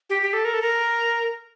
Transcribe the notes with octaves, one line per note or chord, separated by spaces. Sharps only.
G4
G4
A4
A#4
A4
A#4